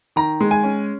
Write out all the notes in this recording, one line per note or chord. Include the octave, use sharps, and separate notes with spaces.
D#3 A#5
G#3
G#5
C#4